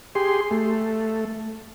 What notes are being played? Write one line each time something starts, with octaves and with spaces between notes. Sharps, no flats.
G4 G#4 C6
A3